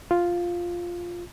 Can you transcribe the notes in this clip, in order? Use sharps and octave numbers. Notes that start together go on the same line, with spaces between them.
F4